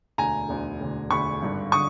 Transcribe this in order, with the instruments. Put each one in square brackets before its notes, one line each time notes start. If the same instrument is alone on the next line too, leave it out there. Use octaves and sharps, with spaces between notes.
[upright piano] E1 D2 D3 G#5 A#5
E1 D2 D3
E1 D2 D3
E1 D2 D3 B5 C#6
G#1 G2 D3
D3 C#6 D#6